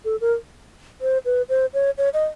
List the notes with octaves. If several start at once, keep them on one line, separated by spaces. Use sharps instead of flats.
A4
A#4
C5
B4
C5
C#5
C#5
D#5